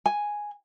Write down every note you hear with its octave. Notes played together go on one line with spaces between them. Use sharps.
G#5